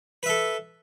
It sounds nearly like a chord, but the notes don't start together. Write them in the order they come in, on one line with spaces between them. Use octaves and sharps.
B4 E5 A4